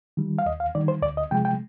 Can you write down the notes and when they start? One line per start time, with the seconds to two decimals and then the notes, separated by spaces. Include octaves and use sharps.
0.17 D#3 G3
0.39 F5
0.46 D#2 D#5
0.60 F5
0.75 D#3 G3 D5
0.88 C5
1.02 D2 D5
1.17 D#5
1.31 C3 F3 G#3 G5
1.45 G5